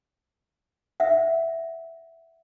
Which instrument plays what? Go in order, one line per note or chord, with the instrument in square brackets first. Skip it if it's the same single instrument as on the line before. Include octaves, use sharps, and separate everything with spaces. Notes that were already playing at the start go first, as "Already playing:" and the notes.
[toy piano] E5 F#5